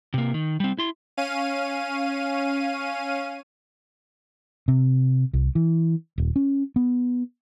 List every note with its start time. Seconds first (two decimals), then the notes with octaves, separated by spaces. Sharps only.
0.14 C3 A#3
0.34 D#3
0.60 G3 C4
0.78 E4 C6
1.17 C#4 F5 D#7
4.68 C3
5.34 C2
5.55 E3
6.18 D#1
6.36 C#4
6.76 B3